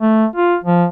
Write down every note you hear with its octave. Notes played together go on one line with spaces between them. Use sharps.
A3
F4
F3